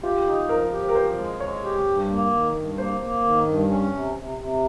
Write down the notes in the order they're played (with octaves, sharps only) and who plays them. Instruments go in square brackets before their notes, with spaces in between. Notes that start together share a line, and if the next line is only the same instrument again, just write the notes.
[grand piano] F4 [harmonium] G4
[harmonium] D#4
[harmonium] F3 [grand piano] A#4
[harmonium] G4
[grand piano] A#4
[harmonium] F3 [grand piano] C5
[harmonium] G#3
[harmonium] G#3 [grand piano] C#5
[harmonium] G4
G2
A#3
D#3
G2
[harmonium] A#3 [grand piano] C5
[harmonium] A#3
D#3
G2
C#4
C3
C3
C3